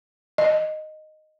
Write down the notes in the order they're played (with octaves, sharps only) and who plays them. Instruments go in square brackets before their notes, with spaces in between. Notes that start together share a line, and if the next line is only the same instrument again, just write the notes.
[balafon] D#5